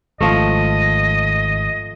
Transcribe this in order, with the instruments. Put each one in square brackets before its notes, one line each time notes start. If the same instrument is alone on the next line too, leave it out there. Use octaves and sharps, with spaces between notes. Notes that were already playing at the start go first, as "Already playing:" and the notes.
[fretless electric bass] G#1 [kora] F3 A3 [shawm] D#5